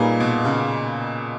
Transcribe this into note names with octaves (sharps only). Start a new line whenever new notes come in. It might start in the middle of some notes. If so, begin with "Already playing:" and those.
Already playing: A#2 G3 A#3 D#4 G#4 B4
B2
C#3